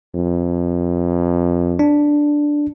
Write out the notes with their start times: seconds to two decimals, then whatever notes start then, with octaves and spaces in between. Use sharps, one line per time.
0.15 F2
1.79 D4